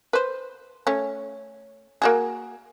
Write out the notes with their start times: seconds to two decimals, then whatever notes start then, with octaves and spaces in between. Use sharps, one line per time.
0.13 B4 C5
0.87 A3 C#4
2.02 A#3 F#4 G#4